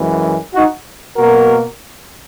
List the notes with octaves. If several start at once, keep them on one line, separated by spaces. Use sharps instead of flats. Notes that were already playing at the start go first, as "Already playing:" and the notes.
Already playing: F#2 E3 G#3
D#4 F#4
B2 A#3 F#4 A#4